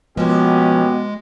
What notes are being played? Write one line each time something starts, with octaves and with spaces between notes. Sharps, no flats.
B2 F3 G#3 A#3 B3 C#4 G4